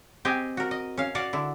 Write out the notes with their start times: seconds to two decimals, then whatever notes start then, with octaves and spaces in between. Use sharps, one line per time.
0.25 C4 G4 D#5 G5 G#5
0.57 F#4 A#4
0.71 D#5
0.97 C#4 F5
1.15 F#4 D5 F5 F#5
1.33 D3 E4